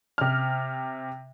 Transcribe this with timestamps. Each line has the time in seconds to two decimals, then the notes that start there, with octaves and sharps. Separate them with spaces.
0.18 C3 F6